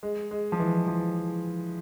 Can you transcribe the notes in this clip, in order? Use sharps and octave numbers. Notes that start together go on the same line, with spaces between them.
G#3
G#3
F3
E3
F3